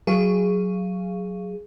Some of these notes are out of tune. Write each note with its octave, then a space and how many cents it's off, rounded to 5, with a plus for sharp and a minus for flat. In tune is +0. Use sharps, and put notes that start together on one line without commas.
F#3 +0 G#4 +0 F5 -15